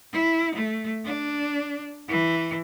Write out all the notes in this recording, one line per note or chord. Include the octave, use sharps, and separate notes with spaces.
E4
A3
D4
E3